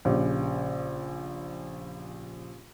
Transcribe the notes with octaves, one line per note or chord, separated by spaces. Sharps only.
A#1 C#3 G4